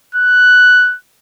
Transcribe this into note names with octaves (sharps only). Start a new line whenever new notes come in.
F#6